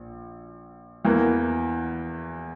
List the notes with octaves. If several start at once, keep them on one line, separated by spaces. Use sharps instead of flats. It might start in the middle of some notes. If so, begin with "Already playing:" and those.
Already playing: A#1
E2 E3 A#3